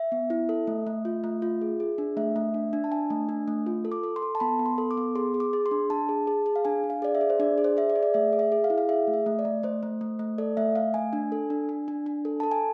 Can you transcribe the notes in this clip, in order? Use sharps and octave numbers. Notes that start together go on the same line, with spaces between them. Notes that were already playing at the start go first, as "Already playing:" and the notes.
Already playing: E5
B3
E4
A4
A3
A3
F4
A3
F4
G#4
G#4
D4
A3 E5
A3
D4
D4
A5
D4 G#5
A3
D4
A3
F4
A4
D6
A4
C6
A4
A5
B3 B5
B3
C6
A4
D6
B3
G#4 C6
G#4
D6
G#4
C6
D4
D4 A5
G#4
G#4
G#4
F5
D4 G#5
D4
F5
G#4 D5
E5
G#4
C5
D4 D5
G#4
C5
G#4 E5
D5
G#4
D5
A3 E5
G#4
E5
G#4
F5
E4
F5
G#4 E5
A3
E5
A3
D5
A3
A3 C5
A3
A3
A3
A4 D5
A3 E5
A3 F5
A3 G#5
D4
A4
D4
D4
D4
D4
A4
A4 A5
G#5